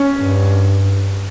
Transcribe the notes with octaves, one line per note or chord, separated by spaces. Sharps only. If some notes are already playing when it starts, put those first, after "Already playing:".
Already playing: C#4
G2